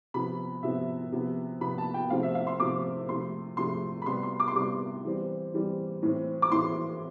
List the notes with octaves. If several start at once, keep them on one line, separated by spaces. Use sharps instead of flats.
C3 F3 B3 B5
C3 F3 B3 E5
C3 F3 B3
C3 F3 B3 B5
A5
G5
C3 F3 A3 C4 F5
E5
F5
C6
C3 F3 A3 C4 D6
C3 F3 A3 C6
C3 F3 A3 C6
B5
C3 G3 B3 C6
C6
D6
C6
C3 G3 B3 D6
E3 G3 C4
E3 G3 C4
A2 E3 A3 C4
D6
A2 E3 A3 C4 C6